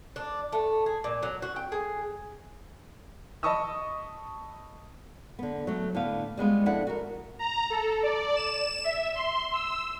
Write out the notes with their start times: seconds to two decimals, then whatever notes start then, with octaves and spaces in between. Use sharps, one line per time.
0.16 D4
0.53 A3
0.86 G#4
1.04 A#2
1.23 F#3
1.42 F#4
1.56 G5
1.72 G#4
3.43 D#5 A5 B5 C#6 D#6 E6
5.39 D3 B3
5.67 F#3 A3
5.95 A2 D3 B3 F5
6.37 G3 G#3 B3 F4
6.66 F2 D4 E4 A4 F#5
6.87 F#4 A#4
7.39 A#5
7.70 A4
8.03 D5
8.36 E7
8.84 E5
9.15 C6
9.53 E6